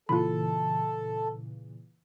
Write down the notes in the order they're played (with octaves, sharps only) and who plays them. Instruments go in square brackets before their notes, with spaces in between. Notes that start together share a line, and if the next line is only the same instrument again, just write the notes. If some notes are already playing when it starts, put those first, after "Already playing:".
[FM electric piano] A#2 C#3 E3 [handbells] F4 B5 [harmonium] A4